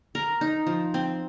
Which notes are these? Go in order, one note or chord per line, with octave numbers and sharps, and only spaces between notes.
A#4
D#4
F3
C4